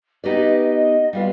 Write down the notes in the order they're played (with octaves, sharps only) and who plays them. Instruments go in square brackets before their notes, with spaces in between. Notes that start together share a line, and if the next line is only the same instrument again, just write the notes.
[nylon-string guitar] B3 D#4 G4 B4 D5 [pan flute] D#5
[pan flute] D#5
[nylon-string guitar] G3 B3 F4 B4 [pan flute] F5